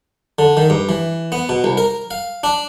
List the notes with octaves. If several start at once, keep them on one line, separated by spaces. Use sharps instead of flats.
D3
D#3
G2
E3
B3
B2
C2
A#4
F5
D4